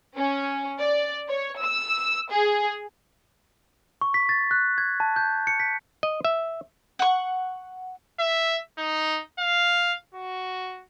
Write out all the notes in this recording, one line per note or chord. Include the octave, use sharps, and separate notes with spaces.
C#4
D5
C#5
E6
G#4
C#6
B6
A6
F#6
G#6
A5
G6
C#7
B6
D#5
E5
F#5 C#6
E5
D#4
F5
F#4